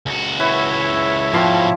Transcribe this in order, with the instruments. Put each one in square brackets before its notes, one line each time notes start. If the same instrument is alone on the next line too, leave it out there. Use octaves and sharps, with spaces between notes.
[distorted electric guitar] C#2 F#4
[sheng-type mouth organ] E4 C#5 E5 [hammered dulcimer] B4
[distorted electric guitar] G#2 B2 [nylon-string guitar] F3 G5 [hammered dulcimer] D5 F5 C6